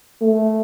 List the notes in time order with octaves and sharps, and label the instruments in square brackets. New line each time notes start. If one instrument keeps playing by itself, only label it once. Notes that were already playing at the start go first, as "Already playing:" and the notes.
[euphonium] A3